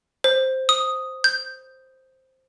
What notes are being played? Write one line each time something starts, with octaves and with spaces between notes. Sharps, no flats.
C5
D#6
G6